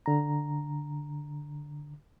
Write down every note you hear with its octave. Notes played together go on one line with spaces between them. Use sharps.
D3 A#5